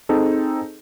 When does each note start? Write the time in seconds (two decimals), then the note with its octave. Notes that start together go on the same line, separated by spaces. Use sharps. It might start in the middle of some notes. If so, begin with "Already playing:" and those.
0.09 C4 D#4 G#4 A4